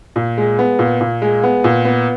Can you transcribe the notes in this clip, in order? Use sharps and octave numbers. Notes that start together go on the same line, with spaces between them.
A#2
G#3
B3
A#2
A#2
G#3
B3
A#2
B3